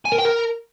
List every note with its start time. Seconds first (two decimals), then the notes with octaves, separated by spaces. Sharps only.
0.05 G#5
0.12 A#4
0.18 G5
0.25 A#4